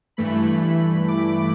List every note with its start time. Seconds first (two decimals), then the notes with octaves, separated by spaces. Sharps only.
0.17 G2 E3 A3 B5
1.08 D6